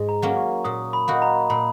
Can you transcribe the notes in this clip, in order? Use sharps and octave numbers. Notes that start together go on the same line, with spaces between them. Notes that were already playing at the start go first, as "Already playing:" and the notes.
Already playing: G#2
A#5
F#3 A#3 C#4
C#6
A#2 D#6
B5
A#3 D#4 F#4
A#5
A#2 B5